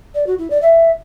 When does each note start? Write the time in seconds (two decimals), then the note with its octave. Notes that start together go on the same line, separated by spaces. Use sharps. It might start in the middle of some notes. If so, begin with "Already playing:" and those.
0.15 D5
0.27 F#4
0.39 E4
0.50 D5
0.62 E5